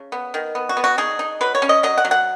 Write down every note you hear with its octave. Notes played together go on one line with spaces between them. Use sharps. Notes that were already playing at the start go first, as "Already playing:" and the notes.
Already playing: C#3
B3
D#3
B3
F#4
B3
F#4
D#4 G#4
D#4
F#3 B4
C#5
C#4
D#5
F#3 D#5
F#5
F#3
F#5